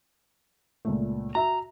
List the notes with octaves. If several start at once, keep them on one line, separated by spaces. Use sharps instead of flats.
C#2 A#2 A3
F#4 E5 A#5